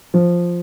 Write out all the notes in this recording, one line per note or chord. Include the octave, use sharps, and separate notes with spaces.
F3